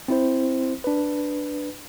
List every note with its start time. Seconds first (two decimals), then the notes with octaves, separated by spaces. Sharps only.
0.08 C4 E4 C5
0.84 D4 B4